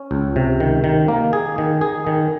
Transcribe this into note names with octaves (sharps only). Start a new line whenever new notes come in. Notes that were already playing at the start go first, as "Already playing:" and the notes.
Already playing: C#4
C#2
C3
D#3
D#3
A#3
G#4
D#3
G#4
D#3